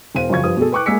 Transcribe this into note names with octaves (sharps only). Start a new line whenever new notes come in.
E1 C5 F5 D#7
F#2 C#3 F3 C#6 G#6
G2 F3 D#6
B2 G#4 A4
B4 G5 C#6 D6 F#6
G#3 A#3 G#5 E6 B6 C#7